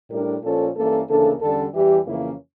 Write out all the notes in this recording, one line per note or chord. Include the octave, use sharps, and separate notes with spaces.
A2 G3 D4 A#4
A#2 F3 C#4 A4
G2 E3 A#3 C#4 A4
D2 C#3 E3 A#3 D4 A4
E2 D3 G3 C#4 A4
E2 E3 G3 G4
F2 C#3 E3 A#3 C#4 E4